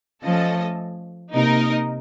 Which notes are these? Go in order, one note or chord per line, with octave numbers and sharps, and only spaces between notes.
F3 A3 C#4 A4 D#5
C3 A#3 D#4 A#4 D#5